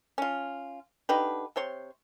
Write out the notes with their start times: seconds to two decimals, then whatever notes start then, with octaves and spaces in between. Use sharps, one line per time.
0.18 C#4 F4
1.09 D3 D#4 G4 B4
1.56 C3 C5 C#5 C6